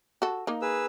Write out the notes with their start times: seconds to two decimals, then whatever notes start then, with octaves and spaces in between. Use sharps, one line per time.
0.22 F#4 A4
0.47 A#3 D#4
0.62 G#4 B4 E6